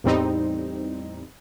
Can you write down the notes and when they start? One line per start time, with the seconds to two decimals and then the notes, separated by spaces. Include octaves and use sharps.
0.04 E2 A2 G3 C4 D#4